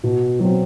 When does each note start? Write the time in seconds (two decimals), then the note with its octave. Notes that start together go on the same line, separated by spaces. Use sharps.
0.03 B2
0.40 F#3 C4